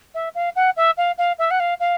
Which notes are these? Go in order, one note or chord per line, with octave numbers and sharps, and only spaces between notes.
E5
F5
F#5
E5
F5
F5
E5
F#5
F5
F5